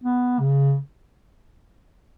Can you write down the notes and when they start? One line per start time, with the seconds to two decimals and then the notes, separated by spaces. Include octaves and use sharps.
0.04 B3
0.40 C#3